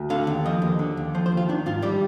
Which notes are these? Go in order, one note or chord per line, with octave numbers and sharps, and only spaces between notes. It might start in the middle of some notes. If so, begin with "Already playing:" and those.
Already playing: D2
D3 F5
D#2
F3 D#5
D#2
D3
D#2
F3 C5
C5
D#2
F4
D#3 D4
G#2 F4
G3 D5